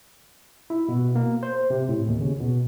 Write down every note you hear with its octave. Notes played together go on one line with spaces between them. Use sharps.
E4
B2
A#3
C5
C3
A2
D#2
C#3
B2